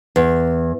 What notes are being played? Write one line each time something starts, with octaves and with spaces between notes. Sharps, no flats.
E2